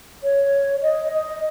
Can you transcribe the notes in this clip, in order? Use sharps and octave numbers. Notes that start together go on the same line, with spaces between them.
C#5
D#5
D#5